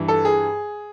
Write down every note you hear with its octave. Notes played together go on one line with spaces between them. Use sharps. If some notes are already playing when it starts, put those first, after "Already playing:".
Already playing: G2 E3
A4
G#4